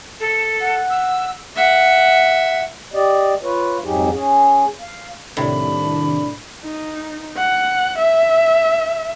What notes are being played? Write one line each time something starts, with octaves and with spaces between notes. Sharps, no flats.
A4
F#5
E6
E5 F#5
G4 D5 D#5
F4 B4 C#5
F2 G#2 F#3 D#4 G4 G#4
C#4 G#4
F5
C2 A2 C3 D#3 D4 B5
D#4
F#5
E5